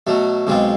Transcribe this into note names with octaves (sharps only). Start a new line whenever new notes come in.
B2 F#3 A3
B1 B2 G#3 C4 F4